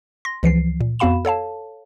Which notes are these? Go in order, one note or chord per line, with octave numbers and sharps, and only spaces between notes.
C6 A#6
C#2 E3 F3 C7
A#2
F2 B3 F#4 F5 B5 E7
A4 C#5 F5 A5